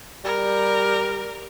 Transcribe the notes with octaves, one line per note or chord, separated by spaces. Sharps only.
G3 A#4